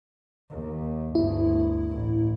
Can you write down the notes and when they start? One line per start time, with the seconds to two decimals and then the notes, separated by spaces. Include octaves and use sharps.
0.50 D#2
1.15 G1 D2 E4
1.90 A1